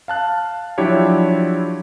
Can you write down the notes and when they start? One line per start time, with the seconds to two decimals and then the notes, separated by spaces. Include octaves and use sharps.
0.08 F5 A5 F#6
0.78 F3 F#3 D4 E4 G4 C#5